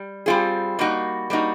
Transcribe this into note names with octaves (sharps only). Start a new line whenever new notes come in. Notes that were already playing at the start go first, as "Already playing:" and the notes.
Already playing: G3
G3 C4 F4 G#4
G3 A#3 D#4 F#4
G3 A#3 D#4 F#4